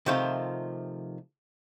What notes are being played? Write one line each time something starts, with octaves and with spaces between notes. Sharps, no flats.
C3 D#3 F3 A3 F4